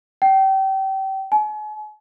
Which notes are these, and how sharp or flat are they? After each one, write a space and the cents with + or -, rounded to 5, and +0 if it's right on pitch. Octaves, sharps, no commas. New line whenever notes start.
G5 -30
G#5 +40